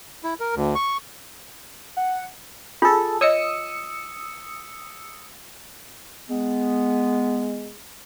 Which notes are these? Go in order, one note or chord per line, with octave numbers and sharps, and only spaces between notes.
E4
A#4
D2
C#6
F#5
F4 G#4 A4
C#5 D#5 D#6 E6 C#7
G#3 B3